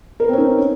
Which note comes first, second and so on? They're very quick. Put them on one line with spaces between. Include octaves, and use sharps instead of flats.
A#4 B4 C4 C#4 D#4